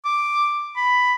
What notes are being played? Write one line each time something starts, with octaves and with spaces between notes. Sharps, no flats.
D6
B5